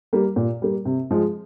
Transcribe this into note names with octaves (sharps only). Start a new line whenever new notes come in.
G3 A#3
A#2
G3 A#3
C3
F3 G#3